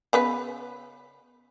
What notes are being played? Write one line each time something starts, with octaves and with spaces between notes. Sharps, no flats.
C#3 B3 B4